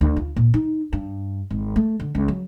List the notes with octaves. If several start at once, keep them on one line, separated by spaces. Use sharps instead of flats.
D2
F4
A#2
D#4
G2
G#1
A3
D3
C#2
F#3